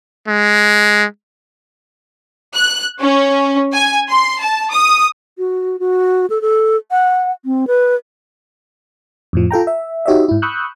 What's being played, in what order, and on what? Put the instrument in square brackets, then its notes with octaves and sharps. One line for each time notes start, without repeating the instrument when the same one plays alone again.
[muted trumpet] G#3
[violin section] F#6
C#4
G#5
C6
A5
D#6
[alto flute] F#4
F#4
A4
A4
F#5
C4
B4
[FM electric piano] F2 A2 F3
F4 A4 G5 A#5
E5
D#4 F#4 G4 C#5 D#5 E5
G#2 E4
B5 C#6 D#6 E6 F#6 G6